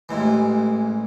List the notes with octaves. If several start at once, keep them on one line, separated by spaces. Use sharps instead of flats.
A1 G#2 E3